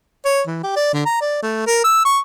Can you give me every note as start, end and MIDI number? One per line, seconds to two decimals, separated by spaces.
0.25 0.42 73
0.47 0.61 52
0.63 0.75 67
0.76 0.93 74
0.93 1.04 50
1.06 1.19 82
1.21 1.41 74
1.43 1.63 57
1.67 1.80 70
1.84 2.01 88
2.05 2.19 85